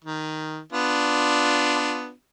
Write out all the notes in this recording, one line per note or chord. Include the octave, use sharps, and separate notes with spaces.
D#3
B3 D4 F4